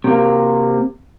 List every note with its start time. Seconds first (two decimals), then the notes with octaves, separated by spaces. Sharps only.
0.04 C3 A#3